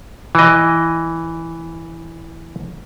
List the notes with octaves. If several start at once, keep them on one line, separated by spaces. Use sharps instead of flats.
E3 D#5